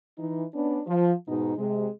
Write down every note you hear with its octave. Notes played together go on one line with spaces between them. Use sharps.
E3 D#4
B3 C#4 D4
F3
G#2 B2 D#4
C3 G#3